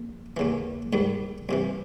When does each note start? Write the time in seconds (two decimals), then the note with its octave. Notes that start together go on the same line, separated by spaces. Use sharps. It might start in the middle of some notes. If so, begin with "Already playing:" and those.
Already playing: A#1
0.37 D#2 C#3 E3
0.93 G#2 D#3 G3
1.49 C2 C3 E3